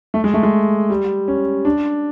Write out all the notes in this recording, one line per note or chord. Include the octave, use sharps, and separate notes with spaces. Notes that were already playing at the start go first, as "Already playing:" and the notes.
A3
G#3
A3
G#3
G3
C#4
D4